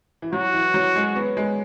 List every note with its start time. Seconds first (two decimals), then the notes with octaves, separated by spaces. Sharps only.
0.22 E3
0.33 F#3 F#4
0.53 E3
0.74 F#3
0.96 G#3
1.16 B3
1.37 G#3